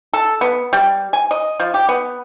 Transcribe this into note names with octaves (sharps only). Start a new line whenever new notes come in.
A4
B3
G3
G#5
D#5
F3
G4
B3